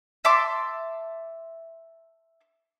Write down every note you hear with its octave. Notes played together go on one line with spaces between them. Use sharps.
E5 A5 C6 D6